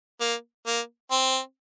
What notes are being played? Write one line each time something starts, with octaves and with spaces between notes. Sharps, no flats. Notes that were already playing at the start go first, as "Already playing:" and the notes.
A#3
A#3
C4